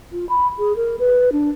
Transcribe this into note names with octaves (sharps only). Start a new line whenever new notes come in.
F4
B5
G#4
A#4
B4
D4